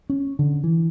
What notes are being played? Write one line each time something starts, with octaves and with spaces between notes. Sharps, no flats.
C#4
D3
E3